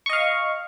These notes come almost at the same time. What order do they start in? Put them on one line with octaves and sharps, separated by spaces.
C#6 D#5 F5